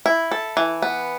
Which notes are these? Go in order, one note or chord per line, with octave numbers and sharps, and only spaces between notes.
E4
A4
E3
B3